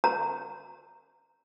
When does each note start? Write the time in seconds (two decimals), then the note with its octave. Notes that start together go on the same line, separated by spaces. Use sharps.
0.04 A#5